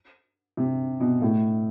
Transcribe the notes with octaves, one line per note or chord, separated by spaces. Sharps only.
C3
B2
A2